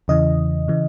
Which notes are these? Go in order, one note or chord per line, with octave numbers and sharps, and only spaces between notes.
E2 C#3 E3 D#5
C#3 E3